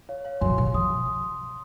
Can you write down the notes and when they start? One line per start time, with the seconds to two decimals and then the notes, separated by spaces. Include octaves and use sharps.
0.09 C#5 F5
0.25 C#5 F5
0.41 F#2 G#5 C6
0.49 A#2
0.58 C3
0.66 C#3
0.74 F3 C6 D#6